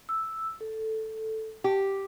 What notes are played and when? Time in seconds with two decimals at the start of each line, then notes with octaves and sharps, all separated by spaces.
0.09 E6
0.61 A4
1.64 G4